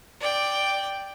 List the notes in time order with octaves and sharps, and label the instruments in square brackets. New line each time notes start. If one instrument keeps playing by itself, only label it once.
[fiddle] D5 G5